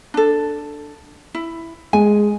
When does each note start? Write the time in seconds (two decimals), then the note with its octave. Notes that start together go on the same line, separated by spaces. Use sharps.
0.14 D4 A4
1.35 E4
1.93 G#3 G#5